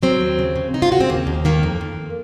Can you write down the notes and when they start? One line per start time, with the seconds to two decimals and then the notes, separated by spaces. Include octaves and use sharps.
0.03 F#3 C4
0.21 D#2
0.39 C#3
0.56 C#3
0.74 C#3 D#4
0.82 F4
0.91 C#3 F#4
1.00 C4
1.09 D#2 A#3
1.27 D#2
1.45 D#3 A#3
1.63 F2
1.81 F2